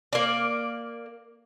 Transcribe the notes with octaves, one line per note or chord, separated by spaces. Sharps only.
A#3 D5